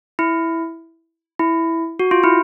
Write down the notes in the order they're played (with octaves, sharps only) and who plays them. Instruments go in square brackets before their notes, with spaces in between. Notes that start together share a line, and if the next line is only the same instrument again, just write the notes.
[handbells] E4
E4
F#4
F4
E4